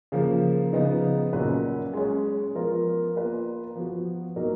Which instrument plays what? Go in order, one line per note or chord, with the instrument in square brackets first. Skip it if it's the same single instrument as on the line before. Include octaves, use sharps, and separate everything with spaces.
[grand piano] C#3 F3 A#3
C#3 F3 B3 D#4
A#2 F#3 C#4 F#4 B4
G#3 C#4 G#4 C#5
F3 B3 F4 A#4
A#3 F4 B4
F3 B3 F#4
B2 F#3 A#3 D#4 A#4